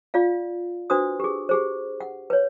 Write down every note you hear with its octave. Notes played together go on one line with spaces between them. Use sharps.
F4 D5 F5
D4 F#4 B4 C5 D#6
G4 G#4
G4 G#4 C5
F#5
B4 C#5